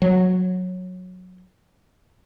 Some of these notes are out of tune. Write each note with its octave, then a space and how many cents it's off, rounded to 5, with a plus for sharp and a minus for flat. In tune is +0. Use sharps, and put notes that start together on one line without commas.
F#3 -15